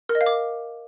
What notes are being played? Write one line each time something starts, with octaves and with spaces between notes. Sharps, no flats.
A#4
D#5
F5
D6